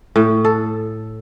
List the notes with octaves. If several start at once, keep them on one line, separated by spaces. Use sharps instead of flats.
A2
A4